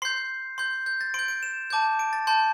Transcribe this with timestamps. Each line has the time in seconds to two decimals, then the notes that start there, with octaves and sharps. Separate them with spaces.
0.02 C6 G6 C7
0.58 C6 G6
0.86 G6
1.01 A6
1.14 C6 G6 D7
1.28 D7
1.43 E7
1.70 A5 D6 G6
1.99 D7
2.13 A6
2.27 A5 C6 G6